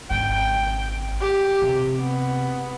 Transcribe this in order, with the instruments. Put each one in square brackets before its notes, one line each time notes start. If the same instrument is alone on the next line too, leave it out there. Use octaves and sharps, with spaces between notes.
[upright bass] G#1 C#3 [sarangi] G5
[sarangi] G4
[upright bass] C3
[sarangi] B3